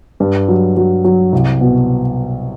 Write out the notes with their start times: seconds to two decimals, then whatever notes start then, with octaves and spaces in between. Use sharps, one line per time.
0.20 G2
0.48 F#3
0.77 F#3
1.04 F#3
1.32 C2
1.61 B2